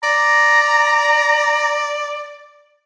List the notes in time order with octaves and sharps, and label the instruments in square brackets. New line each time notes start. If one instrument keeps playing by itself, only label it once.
[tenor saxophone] D5 [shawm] A#5